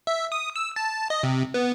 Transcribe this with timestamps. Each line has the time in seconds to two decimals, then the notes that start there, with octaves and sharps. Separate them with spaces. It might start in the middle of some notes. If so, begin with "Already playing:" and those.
0.07 E5
0.32 D#6
0.56 E6
0.76 A5
1.10 D#5
1.23 C3
1.54 B3